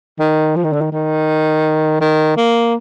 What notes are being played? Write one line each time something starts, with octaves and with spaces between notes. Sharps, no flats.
D#3
F3
D#3
D3
D#3
D#3
D#3
A#3